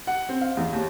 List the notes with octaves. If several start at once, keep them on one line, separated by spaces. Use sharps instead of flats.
F#5
C4
F5
E2
D#2